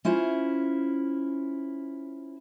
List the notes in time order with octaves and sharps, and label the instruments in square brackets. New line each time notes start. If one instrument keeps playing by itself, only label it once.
[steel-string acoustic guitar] C#4 E4 F4 C5